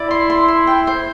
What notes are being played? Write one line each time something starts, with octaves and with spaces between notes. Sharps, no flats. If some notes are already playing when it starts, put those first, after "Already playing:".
Already playing: E4 D5
C6
C6
C6
G5
C5